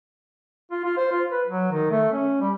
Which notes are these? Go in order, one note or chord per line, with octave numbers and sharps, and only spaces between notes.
F4
F4
C5
F4
B4
F#3
D#3
A3
C#4
G3